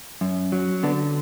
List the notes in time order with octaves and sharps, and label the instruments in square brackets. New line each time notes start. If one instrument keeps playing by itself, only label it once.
[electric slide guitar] F#2
F#3
D3 B3 D4